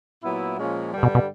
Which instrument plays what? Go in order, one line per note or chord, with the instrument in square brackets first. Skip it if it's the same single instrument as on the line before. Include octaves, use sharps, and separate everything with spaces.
[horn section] A#2 F#3 B3 E4
A#2 F3 G#3 C#4
G2 D3 G3
[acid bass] B2
B2